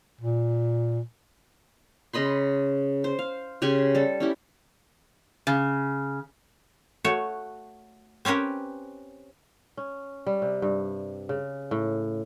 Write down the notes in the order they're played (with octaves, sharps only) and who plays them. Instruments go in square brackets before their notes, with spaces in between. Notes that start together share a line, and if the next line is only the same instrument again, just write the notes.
[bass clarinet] A#2
[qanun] C#3 D#5 B5 C6
C5
F5
C#3 G4 G#5 C6
G3 A4
C#4 E4 G4
[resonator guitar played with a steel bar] C#3
[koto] A3 F#4 C#5
C4 C#4 G4 A#4 B4
[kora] C#4
G3
C3
G2
C#3
A2